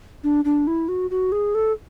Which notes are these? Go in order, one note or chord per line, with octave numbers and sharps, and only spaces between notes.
D4
D4
E4
F#4
F#4
G#4
A4